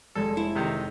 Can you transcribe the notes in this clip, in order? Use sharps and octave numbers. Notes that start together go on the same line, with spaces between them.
F1 G#3 A4 G#6
E4
C3 D#3 D#4